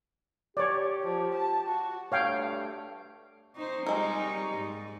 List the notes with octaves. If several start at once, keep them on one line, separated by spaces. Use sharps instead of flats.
G4 C#5 D5
F3
A5
F#4
G2 A3 C#5 F5 G5
C4 D#4 C5 A#5 C#6
G3 G#3 D#4 A#4
G#2